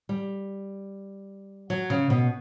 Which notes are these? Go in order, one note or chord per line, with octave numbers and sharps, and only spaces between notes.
G3
F#3
C#3
B2